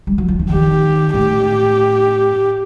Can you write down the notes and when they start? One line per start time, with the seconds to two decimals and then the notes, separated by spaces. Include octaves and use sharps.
0.07 G3
0.18 F#3
0.28 F3
0.39 E3
0.50 D#3 G4
1.14 A2 G4